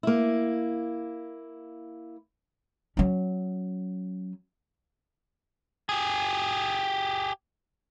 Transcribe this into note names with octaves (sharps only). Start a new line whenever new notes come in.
A#3 E4
F#3 C#4
G4 G#4